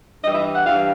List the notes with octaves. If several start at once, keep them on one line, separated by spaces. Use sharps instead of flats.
G2 E3 G3 D#5
E5
F#5
G2 E3 G3 F5